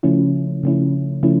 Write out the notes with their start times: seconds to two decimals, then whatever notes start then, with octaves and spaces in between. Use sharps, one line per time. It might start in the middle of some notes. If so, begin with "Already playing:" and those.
0.03 C#3 F3 A3 C#4 E4
0.63 C#3 F3 A3 C#4 E4
1.23 C#3 F3 A3 C#4 E4